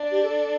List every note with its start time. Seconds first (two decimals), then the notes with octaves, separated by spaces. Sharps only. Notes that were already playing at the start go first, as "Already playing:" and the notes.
Already playing: D4
0.11 G4
0.23 A4